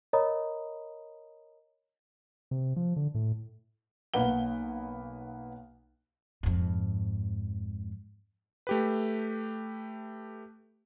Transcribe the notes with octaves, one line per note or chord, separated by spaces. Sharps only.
A#4 C#5 D#5 A#5 B5 D#6
C3
F3
D3
A2
B1 A#3 B4 F#5 G7
F2 G#2
A3 G4 B4